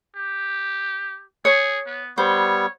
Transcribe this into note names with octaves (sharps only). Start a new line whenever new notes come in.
G4
G#4 C#5
B3
G3 B3 C5 C#5